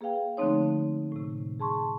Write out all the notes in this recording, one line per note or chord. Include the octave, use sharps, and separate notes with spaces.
A#3 G#4 B4 F5 G5
D3 F3 A3 C4 D#4 C#5
A2 C3
G#4 A5 C6 C#6